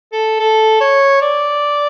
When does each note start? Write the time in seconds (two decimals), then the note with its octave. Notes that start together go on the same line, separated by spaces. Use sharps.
0.12 A4
0.40 A4
0.81 C#5
1.21 D5